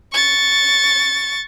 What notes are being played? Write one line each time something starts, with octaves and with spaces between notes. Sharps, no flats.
C#6 A6